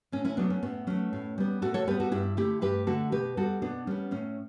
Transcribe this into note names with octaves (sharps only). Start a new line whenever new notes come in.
A2 C#4
C#4 E4
F#3 A3 B3 D4
C#4
A2 B3
F#3 A3 C#4
A2
G3 B3
A2 F#4 A4
A4 C#5
G3 B3 G4 B4
F#4 A4
G2 E4 G4
D3 A3 E4 G4
G2 G4 B4
D3 A3 F#4 A4
B2 G4 B4
G3 B3 F#4 A4
B2 B3 D4
G3 B3 C#4
A2 C#4